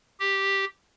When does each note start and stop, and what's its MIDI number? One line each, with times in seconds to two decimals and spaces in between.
0.20 0.65 67